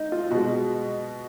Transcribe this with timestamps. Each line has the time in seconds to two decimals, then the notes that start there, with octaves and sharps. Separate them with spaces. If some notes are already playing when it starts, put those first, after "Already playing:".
Already playing: D#4
0.12 F4
0.31 B2 G#3 F#4